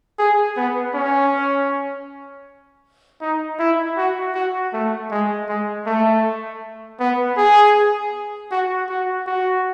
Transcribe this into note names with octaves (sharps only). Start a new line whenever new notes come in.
G#4
B3
C#4
D#4
E4
F#4
F#4
A3
G#3
G#3
A3
B3
G#4
F#4
F#4
F#4